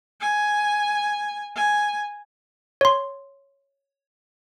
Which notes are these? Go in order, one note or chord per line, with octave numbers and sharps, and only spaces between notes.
G#5
G#5
C#5 C6